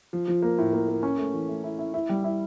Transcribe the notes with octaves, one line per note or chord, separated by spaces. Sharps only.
F3
F3
A#3
A2
A#3
A#3
C#4
A3
E3
A3
E4
E4
E4
G3
E4